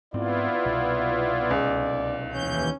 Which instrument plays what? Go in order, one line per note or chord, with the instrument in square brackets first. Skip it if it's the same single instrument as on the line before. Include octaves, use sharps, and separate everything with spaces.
[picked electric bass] G#2 C4 [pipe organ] B3 E4 F4 [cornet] D5
[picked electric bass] C2 B2
[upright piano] C#2
[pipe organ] D#2 E3 G6 [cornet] C#4